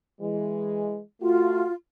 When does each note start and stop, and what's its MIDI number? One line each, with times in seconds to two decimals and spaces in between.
0.21 1.00 52
0.21 1.00 56
1.21 1.65 57
1.21 1.72 65
1.21 1.65 66